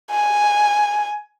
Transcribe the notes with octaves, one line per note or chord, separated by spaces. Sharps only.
G#5